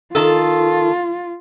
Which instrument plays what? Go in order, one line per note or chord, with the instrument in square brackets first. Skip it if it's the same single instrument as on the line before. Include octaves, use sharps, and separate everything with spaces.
[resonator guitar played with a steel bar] D#3 A4 [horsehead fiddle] F4